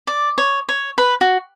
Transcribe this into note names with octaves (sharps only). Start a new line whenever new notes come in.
D5
C#5
C#5
B4
F#4